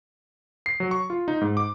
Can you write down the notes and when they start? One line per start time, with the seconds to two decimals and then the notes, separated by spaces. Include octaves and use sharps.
0.66 C7
0.80 F#3
0.91 C#6
1.10 F4
1.28 D#4
1.41 G#2
1.57 D6